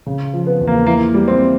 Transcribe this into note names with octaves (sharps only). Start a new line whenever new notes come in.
C#3
F3
B3
E2
A#3
E3 A#3
G3
C4